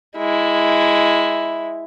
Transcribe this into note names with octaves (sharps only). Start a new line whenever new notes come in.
G#3 E4